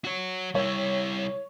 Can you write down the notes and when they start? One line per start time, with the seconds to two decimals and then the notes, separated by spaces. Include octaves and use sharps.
0.04 F#4 C#5
0.55 G3 E4 C#5